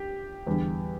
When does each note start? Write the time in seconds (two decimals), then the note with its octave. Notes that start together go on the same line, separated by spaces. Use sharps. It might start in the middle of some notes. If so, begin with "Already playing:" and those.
Already playing: G4
0.47 E2 D3 G3